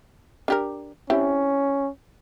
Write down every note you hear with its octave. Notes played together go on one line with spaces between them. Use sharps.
D4 G4 A#4
C4 C#4 E4 G4